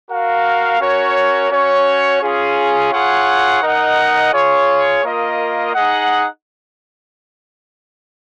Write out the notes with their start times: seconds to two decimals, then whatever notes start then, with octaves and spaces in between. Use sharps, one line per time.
0.11 F#4 A#4 F5
0.80 C#4 F#4 A#4 C#5
1.51 C#4 F#4 C#5
2.22 C#4 F4 G#4
2.93 F4 G#4 C#5 F#5
3.63 D#4 A#4 D#5 F#5
4.33 F4 G#4 C#5
5.03 A#3 F4 A#4 D#5
5.74 D#4 G#4 D#5 F#5